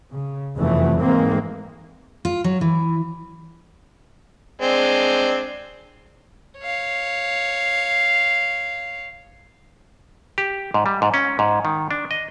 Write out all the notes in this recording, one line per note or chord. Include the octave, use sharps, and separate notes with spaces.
C#3
F1 E2 E3 F#3 A3
G#2 E3 G#3 A#3 C4
F4
F#3
E3
G#3 C4 D4
C#5 F5
G4
G#2
G3
G#2
C#4
G#2
D#3
D4
D#5